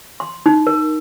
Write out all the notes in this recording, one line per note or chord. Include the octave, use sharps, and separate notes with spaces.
C6
D#4
A#4